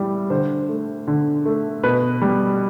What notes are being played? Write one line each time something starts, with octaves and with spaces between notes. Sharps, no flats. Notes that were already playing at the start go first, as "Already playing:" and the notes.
Already playing: A2 G3
D3 C5
A3
D3
A3
B2 B4
G3